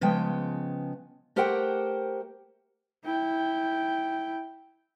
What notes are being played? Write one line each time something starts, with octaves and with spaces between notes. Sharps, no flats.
C#3 F3 G#3 B3 G5
A3 G4 A#4 C5 F#5 G5
E4 G5